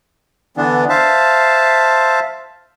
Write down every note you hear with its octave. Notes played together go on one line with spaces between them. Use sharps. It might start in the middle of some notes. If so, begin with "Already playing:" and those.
D3 E3 B3 D4
C5 E5 F5 A5